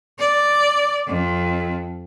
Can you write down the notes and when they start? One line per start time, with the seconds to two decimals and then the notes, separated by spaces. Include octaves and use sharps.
0.19 D5
1.06 F2